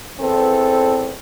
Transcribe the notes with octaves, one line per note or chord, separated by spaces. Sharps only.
E2 C4 A4